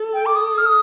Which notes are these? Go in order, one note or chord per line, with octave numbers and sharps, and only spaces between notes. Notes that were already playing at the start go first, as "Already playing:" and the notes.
Already playing: A4
G5
D6
D#6
F6
D#6